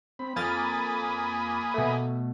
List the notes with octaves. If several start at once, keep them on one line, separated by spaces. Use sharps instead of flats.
C4 B5
F2 A#3 A#4 G#5 B5 D#6 A6
B2 A3